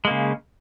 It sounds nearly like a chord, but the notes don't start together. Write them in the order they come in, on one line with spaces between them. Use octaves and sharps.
G#3 A#3 C#3